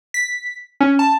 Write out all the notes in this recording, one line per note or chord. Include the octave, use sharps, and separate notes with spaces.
B6
C#4
A5